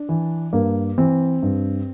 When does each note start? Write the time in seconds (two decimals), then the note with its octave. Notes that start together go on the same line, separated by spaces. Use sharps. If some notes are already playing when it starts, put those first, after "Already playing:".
Already playing: D4
0.09 E3
0.53 G2 A#3
0.98 E3 C4
1.43 G2